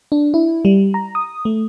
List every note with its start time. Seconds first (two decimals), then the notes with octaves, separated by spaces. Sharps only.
0.12 D4
0.34 E4
0.65 G3
0.94 A#5
1.15 D#6
1.45 A3